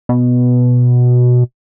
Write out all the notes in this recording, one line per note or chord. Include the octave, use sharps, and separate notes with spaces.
B2